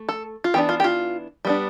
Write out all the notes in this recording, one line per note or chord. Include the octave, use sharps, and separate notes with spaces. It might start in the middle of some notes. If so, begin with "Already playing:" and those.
Already playing: A3
A4
F4
E3 B3 D4 G4
F4
G4
F4
G3 B3 D4